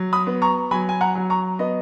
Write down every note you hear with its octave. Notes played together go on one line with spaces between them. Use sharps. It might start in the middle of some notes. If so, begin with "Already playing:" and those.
Already playing: F#3
B5 D#6
B3
A#5 C#6
F#3 G#5 B5
G#5
F#5 A#5
F#3
A#5 C#6
B3 D#5